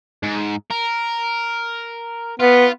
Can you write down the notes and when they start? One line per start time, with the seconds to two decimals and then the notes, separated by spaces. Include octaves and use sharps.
0.23 G#2
0.71 A#4
2.40 B3 F4